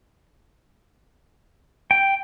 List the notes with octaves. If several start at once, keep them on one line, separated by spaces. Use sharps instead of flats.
G5